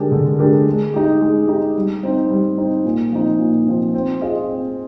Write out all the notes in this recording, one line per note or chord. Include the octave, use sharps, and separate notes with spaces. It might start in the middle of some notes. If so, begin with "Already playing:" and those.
Already playing: D3 G#3 D4 G4 A#4
D3
G#3 D4 G4 A#4
G#3
D#4 G4
G#3
D#4 G4
G3
C4 D#4
G3
C4 D#4
A#2
F3 C4 D#4
A#2
F3 C4 D#4
C4
F4 G#4 D#5
C4